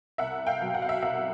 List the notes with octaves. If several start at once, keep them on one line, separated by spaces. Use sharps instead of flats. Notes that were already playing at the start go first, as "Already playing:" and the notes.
C2 E5 F#5
F5 G5
B2 F#3
F#5
F5
E5 F#5
C2 E5 F#5